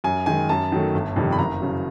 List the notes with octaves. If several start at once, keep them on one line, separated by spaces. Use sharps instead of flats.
F#2 G#5
D#3 G#3 G#5
F#2 A5
D#3 F#3 A3
G1
F2 C3 D#3 G3
B5
F#1 A#5
C#3 F#3